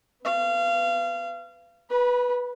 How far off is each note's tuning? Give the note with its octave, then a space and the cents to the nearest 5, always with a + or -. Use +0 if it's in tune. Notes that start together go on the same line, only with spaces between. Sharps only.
B3 +20 F5 -25
B4 -5 B5 -35